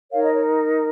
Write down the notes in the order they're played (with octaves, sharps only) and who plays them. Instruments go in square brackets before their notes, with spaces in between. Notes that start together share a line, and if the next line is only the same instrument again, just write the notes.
[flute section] D#4 A#4 C#5 F5
D#5
C#5